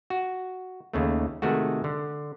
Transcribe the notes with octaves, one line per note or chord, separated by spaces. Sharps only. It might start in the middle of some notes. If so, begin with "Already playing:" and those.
F#4
D#2 C#3 A3
C3 D#3 G#3 A3 F#4
D3